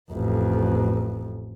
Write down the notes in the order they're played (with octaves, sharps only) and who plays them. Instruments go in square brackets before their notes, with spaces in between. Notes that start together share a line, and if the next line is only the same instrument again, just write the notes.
[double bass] A1 F2